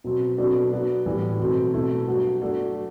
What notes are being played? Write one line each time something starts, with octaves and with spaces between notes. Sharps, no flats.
B2 F#3 C4
B2 F#3 B3 D4 A4
F#3 B3 D4
A2 E3 G3
B2 F#3 A3 C4
B2 A3 E4
G2 F#3 B3 F#4
F#3 A3 D4 F#4